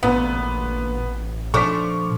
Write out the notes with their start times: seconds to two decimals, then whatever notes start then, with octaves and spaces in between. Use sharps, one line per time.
0.03 A1 D2 A#2 B3
1.54 A#2 F3 A3 D4 C#6 D6 B6